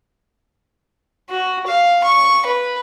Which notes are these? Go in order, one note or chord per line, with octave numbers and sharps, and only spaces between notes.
F#4
F5
C#6
B4